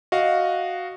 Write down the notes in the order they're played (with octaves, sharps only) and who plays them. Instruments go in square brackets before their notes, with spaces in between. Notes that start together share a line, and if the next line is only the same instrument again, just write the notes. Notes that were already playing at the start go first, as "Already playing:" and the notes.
[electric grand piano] F#4 D#5 F5